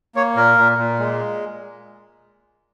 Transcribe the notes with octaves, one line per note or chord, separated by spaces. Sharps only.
A#3 C#5
A#2 A#4
A#2
A#2
G#3